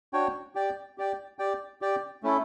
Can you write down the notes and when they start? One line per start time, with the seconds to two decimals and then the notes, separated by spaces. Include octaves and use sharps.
0.13 D4 F#4 C#5 G5
0.55 G4 D5 G5
0.98 G4 D5 G5
1.39 G4 D5 G5
1.81 G4 D5 G5
2.23 A3 C#4 E4 A4